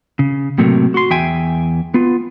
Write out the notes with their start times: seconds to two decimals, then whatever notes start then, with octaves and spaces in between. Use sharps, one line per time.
0.19 C#3
0.58 A2 C3 F#3 A3 A#3
0.94 F#4 C6
1.10 E2 E5 G5 G#5
1.94 B3 F4